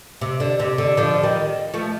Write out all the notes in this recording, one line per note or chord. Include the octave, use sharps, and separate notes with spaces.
C3
D3
C3
D3
D3 F3
D#3 G3
F3 A3